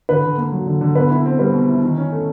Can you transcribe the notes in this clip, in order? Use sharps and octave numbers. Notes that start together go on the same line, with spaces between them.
D3 B4
D3
A#3
F#3
D3
D3
B2 B4
E4
C4
G3 B4
B2
E4
D#3
C#4
A3